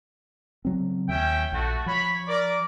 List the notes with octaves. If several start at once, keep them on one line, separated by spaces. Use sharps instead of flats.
C#3 F#3 C4
D#2 C#4 E5 G5
A#1 A3 F#4
F3 C#5 B5
A#4 D5